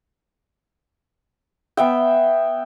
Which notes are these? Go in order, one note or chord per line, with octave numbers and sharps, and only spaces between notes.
B3 E5 G5